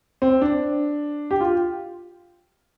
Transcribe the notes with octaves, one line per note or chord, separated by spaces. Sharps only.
C4
D4
G4
F4